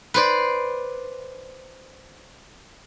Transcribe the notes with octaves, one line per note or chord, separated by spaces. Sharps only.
B4 C5 D5